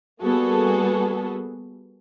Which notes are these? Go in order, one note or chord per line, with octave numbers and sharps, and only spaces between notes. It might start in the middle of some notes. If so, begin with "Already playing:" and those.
G3 A#3 B3 F#4 G#4 A4